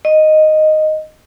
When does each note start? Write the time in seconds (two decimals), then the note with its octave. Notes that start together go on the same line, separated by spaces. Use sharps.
0.05 D#5